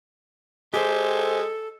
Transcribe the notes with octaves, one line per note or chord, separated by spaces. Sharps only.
G#3 G4 A4 C5